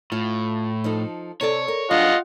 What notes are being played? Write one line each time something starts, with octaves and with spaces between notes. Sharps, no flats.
A2 F4
F3 D#4 A4
C3 A4 C#5 D5
A#4
F#3 D4 F4 D#5 F#5